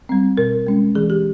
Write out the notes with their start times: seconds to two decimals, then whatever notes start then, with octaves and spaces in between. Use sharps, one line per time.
0.09 G3 C4
0.37 B2 A#4
0.67 G#3 C#4
0.95 E3 G#4
1.10 G4